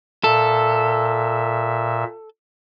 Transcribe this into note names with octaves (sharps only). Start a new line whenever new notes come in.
A#2 A4 E5